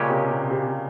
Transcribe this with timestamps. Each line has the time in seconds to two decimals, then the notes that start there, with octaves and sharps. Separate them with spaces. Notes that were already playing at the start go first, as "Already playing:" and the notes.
Already playing: A#2 C#3 G#3 C#4 G4
0.10 C3
0.30 C3
0.51 C3